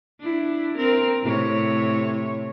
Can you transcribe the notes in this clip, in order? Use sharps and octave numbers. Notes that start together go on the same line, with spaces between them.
D4 E4
C4 A#4
A2 C3 C#5